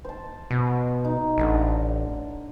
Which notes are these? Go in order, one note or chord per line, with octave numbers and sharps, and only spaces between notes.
C5 A5
B2
D#4
A1 D3 A4
A#5